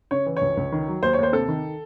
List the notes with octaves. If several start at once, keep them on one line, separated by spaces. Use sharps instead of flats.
C#3 C#5
E3
C#2 C#5
C#2
D#3
F#3
D#2 C5
C#5
D#2 C5
C3 A4
D#3